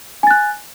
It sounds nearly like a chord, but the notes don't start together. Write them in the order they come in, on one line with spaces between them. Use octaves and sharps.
G#5 A6 F#6